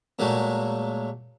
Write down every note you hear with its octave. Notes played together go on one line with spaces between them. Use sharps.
A#2 F#3 G#3 A3